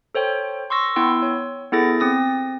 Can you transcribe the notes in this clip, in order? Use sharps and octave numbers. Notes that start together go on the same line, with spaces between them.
A4 C5 C#5 G5
C6 C#6 E6 A#6
B3 E4 G5 C6 E6
C#5
B3 E4 G#4 A4 A6 A#6
C4 D#6 A#6